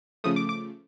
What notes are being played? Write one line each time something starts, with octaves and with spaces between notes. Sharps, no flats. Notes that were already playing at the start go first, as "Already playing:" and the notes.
C#3 F3 A3 D#6
D6
D6